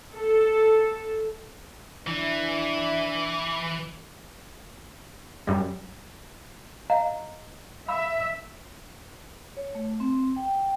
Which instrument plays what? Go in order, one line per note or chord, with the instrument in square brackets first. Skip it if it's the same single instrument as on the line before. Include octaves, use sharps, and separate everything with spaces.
[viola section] A4
[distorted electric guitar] E3 [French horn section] D4 E4
[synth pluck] F#2 G3
[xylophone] D#5 F5 A#5
[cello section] E5 [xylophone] F5 B5 E6
[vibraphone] C#5
A3
C4
G5